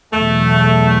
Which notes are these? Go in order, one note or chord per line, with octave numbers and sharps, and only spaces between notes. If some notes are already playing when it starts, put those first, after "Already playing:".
E2 B2 F#3 A3